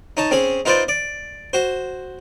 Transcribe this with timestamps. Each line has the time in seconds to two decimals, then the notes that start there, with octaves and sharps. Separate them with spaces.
0.17 D#4 C#5 A5
0.31 C4 C#4 G#4
0.65 D#4 F4 B4 C5 D5
0.88 D5
1.53 F#4 C5